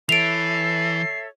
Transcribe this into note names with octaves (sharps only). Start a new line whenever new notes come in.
E3 A4 C#5 E5 C7 D7 F7